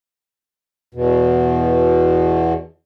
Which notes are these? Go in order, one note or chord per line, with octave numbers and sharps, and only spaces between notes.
E2 B2